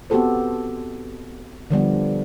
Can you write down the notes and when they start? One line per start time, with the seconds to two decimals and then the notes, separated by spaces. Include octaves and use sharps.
0.10 B3 C4 F#4 G4 A4 C5
1.70 D3 F3 G3 B3